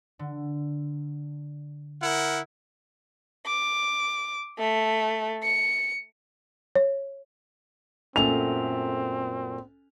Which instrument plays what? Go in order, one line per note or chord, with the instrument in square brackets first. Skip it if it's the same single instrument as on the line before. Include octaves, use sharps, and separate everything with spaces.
[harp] D3
[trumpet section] E4 A#4 F#5
[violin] D6
A3
C#7
[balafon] C#5
[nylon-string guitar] F#2 A#2 A3 [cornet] C4 [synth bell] C#4 A4 G#5 [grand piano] F7